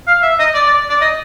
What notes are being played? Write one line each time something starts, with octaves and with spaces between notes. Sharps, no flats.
F5
E5
D#5
D5
D5
D5
D#5